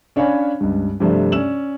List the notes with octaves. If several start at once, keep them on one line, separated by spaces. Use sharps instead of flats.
C#4 D4 C#5 F5 G#5 B5
C#2 G2
G2 C3 F3 A3 D4
C#4 D5 E6 E7 F#7